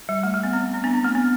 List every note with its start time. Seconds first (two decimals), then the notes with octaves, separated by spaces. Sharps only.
0.09 G3
0.23 A3
0.34 A3
0.43 B3
0.53 C4
0.74 C4
0.84 B3 D4
0.94 C4
1.04 A3
1.15 B3